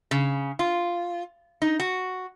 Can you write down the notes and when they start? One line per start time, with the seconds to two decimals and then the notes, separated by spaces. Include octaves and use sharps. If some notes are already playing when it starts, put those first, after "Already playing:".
0.11 C#3
0.59 F4
1.62 D#4
1.80 F#4